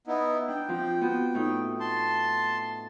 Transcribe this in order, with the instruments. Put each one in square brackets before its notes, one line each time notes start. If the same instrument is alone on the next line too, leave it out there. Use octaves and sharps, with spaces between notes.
[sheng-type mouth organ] B3 D#4 E4
[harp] D4 [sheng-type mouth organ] G5
[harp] F3 C4
B3 F#4
A2 D#4
[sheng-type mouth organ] A5 C6